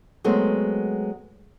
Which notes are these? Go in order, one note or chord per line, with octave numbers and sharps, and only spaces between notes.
F#3 G#3 A3 B3 C4